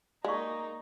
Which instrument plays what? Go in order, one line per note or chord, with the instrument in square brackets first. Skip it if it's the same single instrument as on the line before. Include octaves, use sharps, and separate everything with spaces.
[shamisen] G#3 [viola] A#3 D#4 [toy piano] D5 F5 C#6